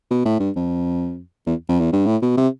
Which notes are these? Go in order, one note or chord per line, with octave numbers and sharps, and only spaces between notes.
B2
A2
G2
F2
E2
F2
E2
G2
A2
B2
C3